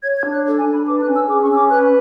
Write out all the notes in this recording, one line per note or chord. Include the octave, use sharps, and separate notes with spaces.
C#5 G#6
G#6
D4
F#6
A4
G#5
D4
B5
B4 D6
F#6
C#4
E6
G#4 D6
C#6
C#4 E6
D6
B4 F#6